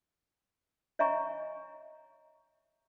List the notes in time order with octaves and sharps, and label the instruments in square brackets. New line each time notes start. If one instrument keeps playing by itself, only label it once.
[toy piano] C#5 D#5 E5 G#5 A#5 C#6